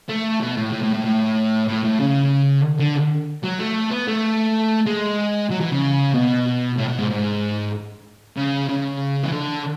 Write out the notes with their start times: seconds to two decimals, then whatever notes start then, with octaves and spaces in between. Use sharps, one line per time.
0.09 A3
0.41 B2
0.57 A2
0.73 A2
0.83 A2
0.94 A2
1.05 A2
1.68 A2
1.85 A2
2.00 C#3
2.79 D3
3.43 F#3
3.59 A3
3.91 B3
4.07 A3
4.86 G#3
5.50 F#3
5.61 E3
5.72 C#3
6.14 B2
6.78 A2
6.88 B2
6.99 G#2
7.10 G#2
8.37 C#3
8.69 C#3
9.23 E3
9.32 D3